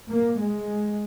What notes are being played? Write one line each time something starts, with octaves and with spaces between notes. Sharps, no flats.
A#3
G#3